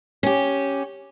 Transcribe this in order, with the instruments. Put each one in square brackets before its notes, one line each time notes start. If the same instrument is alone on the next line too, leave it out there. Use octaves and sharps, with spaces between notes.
[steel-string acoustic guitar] C#4 G4